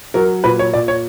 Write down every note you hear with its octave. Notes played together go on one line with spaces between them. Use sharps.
F#3 A#4
A#2 B4
C#5
A#2 D5
C#5